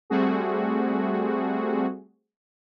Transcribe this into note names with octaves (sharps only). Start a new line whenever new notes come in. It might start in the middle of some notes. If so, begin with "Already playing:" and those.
G3 A3 C4 F#4 G#4